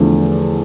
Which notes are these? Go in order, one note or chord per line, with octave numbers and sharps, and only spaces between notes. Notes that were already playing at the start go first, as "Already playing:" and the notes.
Already playing: E2 D3 F3 A3